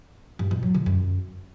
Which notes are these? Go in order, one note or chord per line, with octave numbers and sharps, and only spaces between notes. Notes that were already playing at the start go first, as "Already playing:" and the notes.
G2
B2
F#3
D3
F#2